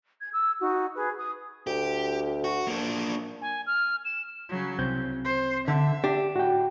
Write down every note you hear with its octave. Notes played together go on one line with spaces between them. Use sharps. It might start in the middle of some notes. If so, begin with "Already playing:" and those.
G#6
E6
D#4 F#4
G#4 B4
D#6
D2 G4
F#4
A#3 D4
G#5
F6
E7
C#3 F#3
C2 C#3 C4 G6
C5
D3 E5
D4 G4
A2 F#4 G5